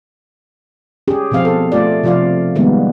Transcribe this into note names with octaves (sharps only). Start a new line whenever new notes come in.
C#4 G4 G#4
B2 F3 C4 F5
A4
A3 F4 D5
C3 F3 F4 D5 F5
D#3 G3 G#3 A#3 B3